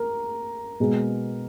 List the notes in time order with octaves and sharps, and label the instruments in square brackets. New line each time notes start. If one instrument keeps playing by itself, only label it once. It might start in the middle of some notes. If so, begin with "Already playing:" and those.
Already playing: [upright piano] A#4
B2 G#3 B3